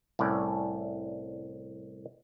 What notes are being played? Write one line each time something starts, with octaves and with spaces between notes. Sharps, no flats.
C2 A2 C#4 D5